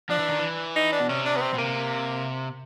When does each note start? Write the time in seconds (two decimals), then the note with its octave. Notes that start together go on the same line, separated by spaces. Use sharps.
0.10 F3 D4
0.19 E3
0.29 D#3
0.39 E3
0.76 D#4
0.92 D4
1.00 B2
1.09 C3 C#4
1.25 D4
1.37 B3
1.42 C4
1.54 B2
1.58 C3 A#3